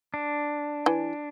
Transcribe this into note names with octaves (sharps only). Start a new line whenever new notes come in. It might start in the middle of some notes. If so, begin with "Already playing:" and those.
D4
E3